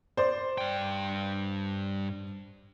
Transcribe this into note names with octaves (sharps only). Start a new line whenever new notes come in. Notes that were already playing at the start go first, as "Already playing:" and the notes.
C5 D5 C6
G2 G5